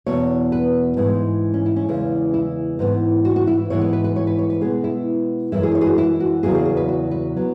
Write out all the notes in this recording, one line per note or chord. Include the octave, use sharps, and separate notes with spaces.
E2 B2 B3 C#5
B4
G#2 E3 G#3
C#4
E4
C#4
E2 C#3 E3 G#3
E4
G#2 E3 B3
F#4
F#4
E4
G#2 E3 G#3 B3 C#5
B4
B4
B4
C#5
B4
C#5
B4
B2 G#3 B3 G#4
E4
F#2 E3 G#3 E4
G#4
C#5
G#4
F#4
E4
F#4
E2 C#3 F#3 B3 G#4
G#4
G#4
B4
F#4
B4
F#3 B3